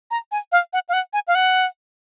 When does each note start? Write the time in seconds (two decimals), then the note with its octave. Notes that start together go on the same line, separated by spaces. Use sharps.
0.11 A#5
0.32 G#5
0.52 F5
0.73 F#5
0.89 F5
0.93 F#5
1.13 G#5
1.28 F5
1.35 F#5